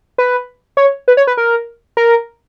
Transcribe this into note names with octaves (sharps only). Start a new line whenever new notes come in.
B4
C#5
B4
C#5
B4
A#4
A#4